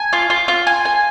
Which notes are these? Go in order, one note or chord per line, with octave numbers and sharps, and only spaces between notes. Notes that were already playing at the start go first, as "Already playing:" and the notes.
Already playing: G#5
F4
F4
F4
G#5
G#5